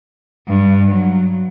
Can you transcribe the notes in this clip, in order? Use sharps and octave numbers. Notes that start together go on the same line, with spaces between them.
G2
F#3